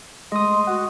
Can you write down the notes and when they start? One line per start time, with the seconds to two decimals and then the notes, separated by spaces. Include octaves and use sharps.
0.32 G#3 A3 D#5 C6 D#6
0.67 F#4 F#5